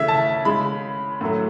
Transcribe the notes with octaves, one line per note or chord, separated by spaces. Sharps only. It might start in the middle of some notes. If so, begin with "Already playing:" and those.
Already playing: C#3 E3 A3 E5
A5
C#3 G#3 B5
A2 F#3 A3